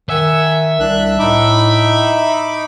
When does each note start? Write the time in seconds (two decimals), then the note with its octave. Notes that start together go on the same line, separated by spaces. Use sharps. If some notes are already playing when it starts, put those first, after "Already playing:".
0.09 D#3 E5 F#5 G#5
0.80 C2 D4 F#6
1.19 A2 D#4 B5 D6